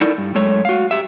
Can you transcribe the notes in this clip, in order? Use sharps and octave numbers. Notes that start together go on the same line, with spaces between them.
D#4 E4 A4 A#4 D5
G2
F#2 G#3 A3 A4 C#5
F#4 F5
G4 E5